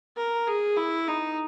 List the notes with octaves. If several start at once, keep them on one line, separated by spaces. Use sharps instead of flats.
A#4
G#4
E4
D#4